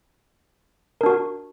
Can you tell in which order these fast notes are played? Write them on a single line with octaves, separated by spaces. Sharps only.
A#4 D4 F#4